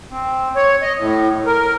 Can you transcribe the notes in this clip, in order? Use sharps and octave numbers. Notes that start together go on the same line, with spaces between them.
C4
C#5
D#5
A2
A#4